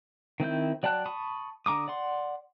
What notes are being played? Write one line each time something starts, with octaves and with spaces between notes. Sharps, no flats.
D#3 C4 E4 G6
F#3 D5 G5 A5 F#6
A5 B5 C#6 D#6
D3 A#5 D6 D#6
D5 F#5 C6